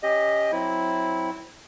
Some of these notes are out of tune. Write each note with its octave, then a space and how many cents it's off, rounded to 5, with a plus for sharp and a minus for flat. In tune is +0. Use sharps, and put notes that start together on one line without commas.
C#4 +0 G4 +25 D#5 +0
F#3 +0 C4 +0 E4 -10